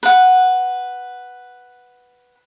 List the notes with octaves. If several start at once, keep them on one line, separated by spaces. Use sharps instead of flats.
B4 F#5